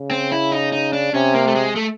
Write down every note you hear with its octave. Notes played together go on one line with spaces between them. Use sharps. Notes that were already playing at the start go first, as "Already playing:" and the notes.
Already playing: C#3
C4
E4
D#4
D#4
D4
C3 C#4
A#3
A3
G#3
A3